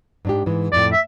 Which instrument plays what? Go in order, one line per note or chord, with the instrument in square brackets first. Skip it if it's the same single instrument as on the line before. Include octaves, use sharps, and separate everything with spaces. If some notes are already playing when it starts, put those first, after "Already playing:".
[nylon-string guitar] G#2 D4 G4
G#2 E3 G#3
[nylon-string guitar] F2 A2 [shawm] D5
[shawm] E5